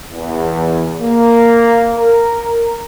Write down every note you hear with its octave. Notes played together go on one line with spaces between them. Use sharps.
E2
A#3
A#4